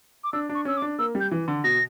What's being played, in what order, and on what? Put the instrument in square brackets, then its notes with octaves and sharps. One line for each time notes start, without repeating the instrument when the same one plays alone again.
[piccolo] D6
[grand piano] D4 [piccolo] E6
[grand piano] D4
[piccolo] C#6
[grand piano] C#4 [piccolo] E6
[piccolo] D6
[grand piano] D4
[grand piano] A#3 [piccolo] E6
[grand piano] G3
[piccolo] G6
[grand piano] E3
D3
[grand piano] B2 [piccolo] A#6